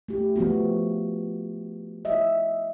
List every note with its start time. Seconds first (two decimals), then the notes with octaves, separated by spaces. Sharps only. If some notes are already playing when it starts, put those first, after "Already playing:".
0.08 A3 G4
0.36 F3 A3 B3 F#4
2.05 D#5 E5